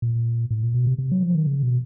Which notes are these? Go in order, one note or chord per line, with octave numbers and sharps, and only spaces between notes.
A#2
A2
A#2
B2
C3
C3
F#3
F3
D#3
C#3
B2